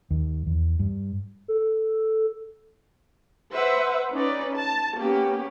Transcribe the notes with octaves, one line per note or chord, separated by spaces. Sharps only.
D#2
E2
G2
A4
B4 C5 E5 F#5
C#4 D#4 B4 D5
A5
A#3 B3 C#4 G4